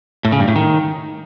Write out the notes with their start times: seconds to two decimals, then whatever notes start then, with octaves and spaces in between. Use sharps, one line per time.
0.25 A2
0.32 C#3
0.40 G2
0.48 A2
0.56 D#3